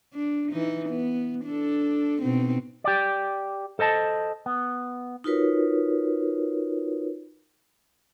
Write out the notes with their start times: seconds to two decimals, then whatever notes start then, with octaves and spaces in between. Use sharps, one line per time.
0.13 D4
0.52 E3 D#4
0.89 B3
1.45 D4 A4
2.22 B2 C4 D#4
2.84 G4 D5
3.79 A4 C5 D#5 A5
4.46 B3
5.24 D#4 F4 F#4 A#4 B4 C#5